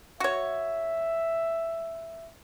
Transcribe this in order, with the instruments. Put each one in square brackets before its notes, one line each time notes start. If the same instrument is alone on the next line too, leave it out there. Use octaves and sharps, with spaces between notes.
[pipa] F#4 C#5 [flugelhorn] E5